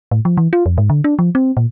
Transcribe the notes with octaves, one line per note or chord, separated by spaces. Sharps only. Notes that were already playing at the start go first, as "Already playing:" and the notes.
A2
F3
E3
F4
F2
G#2
D3
D4
F3
C4
A#2